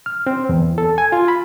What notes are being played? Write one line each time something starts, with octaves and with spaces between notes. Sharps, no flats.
F6
C4
E2
A4
G#5
F4
B5